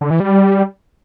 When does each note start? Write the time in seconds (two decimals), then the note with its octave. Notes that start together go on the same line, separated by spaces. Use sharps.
0.01 D3
0.11 E3
0.20 G3